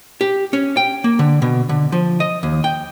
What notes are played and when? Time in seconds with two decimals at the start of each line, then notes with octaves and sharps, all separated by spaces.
0.21 G4
0.53 C#4
0.77 G5
1.04 A#3
1.19 D3
1.42 B2
1.69 D3
1.92 F3
2.20 D#5
2.43 D#2
2.64 G5